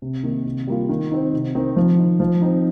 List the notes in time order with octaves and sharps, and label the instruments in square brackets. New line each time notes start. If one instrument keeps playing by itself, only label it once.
[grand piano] C3
D#3 A#3 D#4
C3
G3 A#3 F4
D#3
C4 D#4
C3
D#3 C4 D#4
F3
D#4
F3
C4 D#4